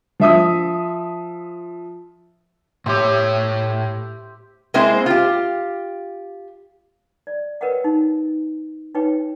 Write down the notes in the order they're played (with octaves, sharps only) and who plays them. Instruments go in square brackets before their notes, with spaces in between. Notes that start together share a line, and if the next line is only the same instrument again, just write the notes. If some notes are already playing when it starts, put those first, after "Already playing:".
[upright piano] F3 E5 D#6
[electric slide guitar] A2 C#5 [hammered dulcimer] G4 C5 E5
[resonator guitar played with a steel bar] G#3 A#3 C4 E4 C5
F4 G4
[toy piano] D5
A#4 B4 C#5 D#5 F#5 G5
D#4
D#4 B4 C#5 G5